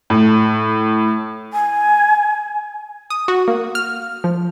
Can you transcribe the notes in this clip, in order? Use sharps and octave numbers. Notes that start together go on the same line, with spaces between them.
A2
G#5
D#6
F#4
A#3
F6
F3